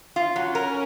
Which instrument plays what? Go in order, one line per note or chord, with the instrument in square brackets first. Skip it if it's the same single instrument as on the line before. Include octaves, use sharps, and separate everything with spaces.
[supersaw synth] C#4 [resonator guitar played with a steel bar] F4
[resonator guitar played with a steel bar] F#3
A#4